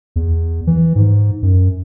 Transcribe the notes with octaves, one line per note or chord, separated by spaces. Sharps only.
E2
E3
G#2
F#2